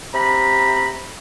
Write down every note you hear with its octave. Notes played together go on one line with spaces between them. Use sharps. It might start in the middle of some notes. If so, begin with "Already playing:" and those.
C3 A#5 B5